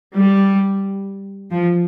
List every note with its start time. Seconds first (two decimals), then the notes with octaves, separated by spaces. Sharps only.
0.15 G3
1.51 F3